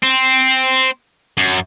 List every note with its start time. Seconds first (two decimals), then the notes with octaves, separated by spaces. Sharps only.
0.03 C4
1.37 F#2